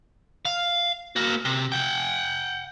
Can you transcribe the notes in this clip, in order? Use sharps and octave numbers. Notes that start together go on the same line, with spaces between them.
F5
A#3 F#4
C3
F#5 G5